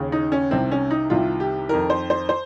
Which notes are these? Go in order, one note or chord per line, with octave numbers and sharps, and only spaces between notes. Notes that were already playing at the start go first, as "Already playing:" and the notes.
Already playing: D#2 C#3
D#4
C#4
C2 C3 D#3 C4
C#4
D#4
C2 C3 D#3 F4
G4
F2 D#3 A#4
C5
C5
C5